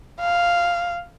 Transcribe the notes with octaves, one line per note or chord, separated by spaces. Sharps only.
F5